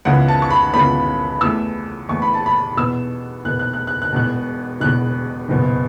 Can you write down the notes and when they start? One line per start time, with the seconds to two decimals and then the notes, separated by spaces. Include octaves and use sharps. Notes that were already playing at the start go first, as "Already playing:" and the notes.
0.05 C#2 C#3 E3 B3 F#5
0.28 A5
0.42 C#6
0.50 B5
0.74 C#2 C#3 E3 B3 B5
1.41 E2 E3 A3 E6
2.09 E2 E3 A3 C#6
2.22 B5
2.34 A5
2.46 B5
2.77 E2 B2 B3 E6
3.44 E2 B2 B3 F#6
3.59 F#6
3.73 F#6
3.87 F#6
4.02 F#6
4.13 E1 E2 B2 F#6
4.80 E1 E2 B2 F#6
5.48 F#1 E2 B2 B3